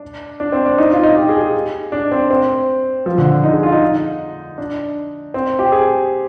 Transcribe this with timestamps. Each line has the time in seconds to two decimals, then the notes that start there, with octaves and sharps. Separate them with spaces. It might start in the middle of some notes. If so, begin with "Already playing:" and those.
Already playing: D4
0.40 D4
0.52 C4
0.66 D4
0.78 D#4
0.91 F4
1.03 D#4
1.16 G4
1.29 G#4
1.41 G#4
1.92 D4
2.12 C4
2.31 C4
3.06 F3
3.18 D3
3.44 D#4
3.53 G#4
3.63 F4
3.72 D#4
4.58 D4
5.34 C4
5.59 G4
5.72 G#4